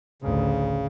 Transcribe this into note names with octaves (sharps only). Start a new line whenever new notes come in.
A1 D2 C#3